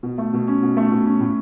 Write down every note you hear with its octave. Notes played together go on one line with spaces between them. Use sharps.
B2
A3
B2
C#4
B2
A3
B2
C#4
A2